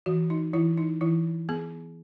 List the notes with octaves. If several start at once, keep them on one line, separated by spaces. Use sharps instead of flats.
E3 F#4
D#4
E3 E4
D#4
E3 E4
B3 G#4